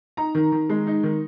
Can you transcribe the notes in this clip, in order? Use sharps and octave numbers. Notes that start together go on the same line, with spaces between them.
D#4 A#5
D#3
D#3
G#3
D#4
D#3